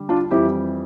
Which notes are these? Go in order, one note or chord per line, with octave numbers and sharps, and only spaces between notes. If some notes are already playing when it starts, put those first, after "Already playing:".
Already playing: D3 G3
D4 F4
F2 E3 G3 E4 G4